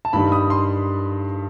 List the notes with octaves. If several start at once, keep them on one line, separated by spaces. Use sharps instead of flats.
A5
G2 D#3 G3 D#4 B5
D#6
C6